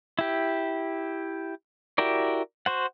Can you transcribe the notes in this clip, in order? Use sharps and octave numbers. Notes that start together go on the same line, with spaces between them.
E4 G4
E4 F#4 G4 A#4 D5
F#4 C5 F#5